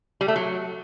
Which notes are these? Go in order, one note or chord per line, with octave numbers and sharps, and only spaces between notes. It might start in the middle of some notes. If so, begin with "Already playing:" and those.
G3
A3
F#3